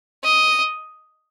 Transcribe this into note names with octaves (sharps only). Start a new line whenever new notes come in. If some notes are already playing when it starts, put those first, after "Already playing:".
D#5